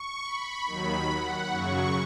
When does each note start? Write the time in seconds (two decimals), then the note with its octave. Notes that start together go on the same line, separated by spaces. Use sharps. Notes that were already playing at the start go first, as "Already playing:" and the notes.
Already playing: C#6
0.24 B5
0.65 D#2 D#3 F#3 B5
1.08 F#5
1.50 F#2 C#3 F#3 C#6